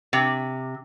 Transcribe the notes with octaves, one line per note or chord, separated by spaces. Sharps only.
C3